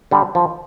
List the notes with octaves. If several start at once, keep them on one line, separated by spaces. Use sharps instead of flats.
D3 G3
F3